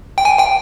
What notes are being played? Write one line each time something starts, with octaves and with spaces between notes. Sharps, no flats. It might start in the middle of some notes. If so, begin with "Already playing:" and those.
G5
G#5
G5